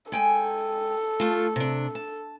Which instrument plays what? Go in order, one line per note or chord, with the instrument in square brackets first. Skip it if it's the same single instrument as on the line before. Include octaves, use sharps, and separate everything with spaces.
[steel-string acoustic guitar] G#3 G5 G#5 [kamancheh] A4
[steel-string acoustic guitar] A3 F4
C3 D4
A5